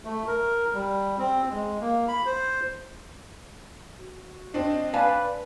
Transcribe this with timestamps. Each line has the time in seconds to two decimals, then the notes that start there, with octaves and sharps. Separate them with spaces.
0.05 A3
0.27 A#4
0.74 G3
1.19 C4
1.50 G#3
1.81 A#3
2.08 B5
2.26 C5
3.98 F#4
4.54 C4 D4 D#5
4.94 B4 D5 F5 G#5 A5